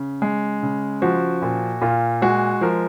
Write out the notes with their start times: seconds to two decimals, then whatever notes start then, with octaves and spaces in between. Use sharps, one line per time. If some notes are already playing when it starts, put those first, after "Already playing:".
Already playing: C#3
0.22 G#3
0.63 C#3
1.02 F3 F#4
1.42 A#2
1.81 A#2 F4
2.22 G#3 F#4
2.61 F3 A#4